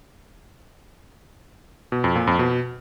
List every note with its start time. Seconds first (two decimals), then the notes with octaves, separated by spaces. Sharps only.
1.92 B2
2.04 F2
2.16 A#2
2.27 F2
2.39 B2